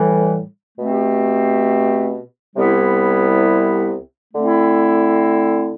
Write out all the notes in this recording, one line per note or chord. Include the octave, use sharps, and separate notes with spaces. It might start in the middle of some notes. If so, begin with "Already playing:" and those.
Already playing: A2 E3 G3
B2 A3 C4 G4
C2 C3 G3 B3 E4
D3 A3 C4 E4